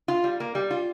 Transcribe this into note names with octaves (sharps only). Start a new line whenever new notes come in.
F4
G3
A#3
G3
F4